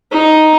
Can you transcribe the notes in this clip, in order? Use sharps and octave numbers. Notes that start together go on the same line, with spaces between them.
D#4